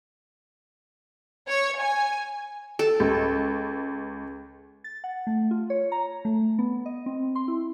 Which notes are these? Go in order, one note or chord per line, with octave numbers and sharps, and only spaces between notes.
C#5
G#5
A4
C#2
A6
F#5
A3
F4
C#5
A#5
A3
B3
D#5
C4
C6
E4